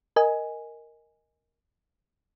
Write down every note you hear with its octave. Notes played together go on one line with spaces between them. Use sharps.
A#4 D#5 G#5